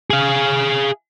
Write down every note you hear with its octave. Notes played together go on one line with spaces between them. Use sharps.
G#4 F5